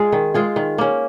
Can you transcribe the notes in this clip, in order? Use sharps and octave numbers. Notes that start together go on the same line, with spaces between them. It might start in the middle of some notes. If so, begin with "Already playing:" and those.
Already playing: G#3 F4 G#4
D#3
G#3 F4 G#4
D#3
A#3 C#4